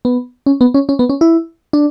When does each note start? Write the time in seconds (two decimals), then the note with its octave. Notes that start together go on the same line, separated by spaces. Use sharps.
0.05 B3
0.46 C#4
0.61 B3
0.74 C#4
0.89 C#4
0.99 B3
1.09 C#4
1.21 E4
1.73 D4